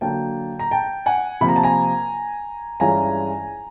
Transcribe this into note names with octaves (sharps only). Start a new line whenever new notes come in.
D3 F#3 A#3 G5 A5
A#5
G5 A5
F#5 G#5
C3 F3 A#3 B5
A#5
A5
G#5 A#5
G2 E3 G#3 C#4 F4 G#5 A#5